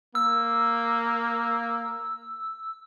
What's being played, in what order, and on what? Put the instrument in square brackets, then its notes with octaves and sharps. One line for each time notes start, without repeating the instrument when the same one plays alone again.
[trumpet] A#3 [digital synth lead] E6